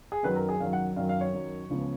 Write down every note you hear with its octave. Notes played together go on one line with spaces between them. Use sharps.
G#4
F#2 D#3 F#3 B4
A#4
G#4
F#2 D#3 F#3 F5
F#5
F#2 D#3 F#3 F5
F5
C#5
F#2 D#3 F#3
C#2 C#3 F3 B3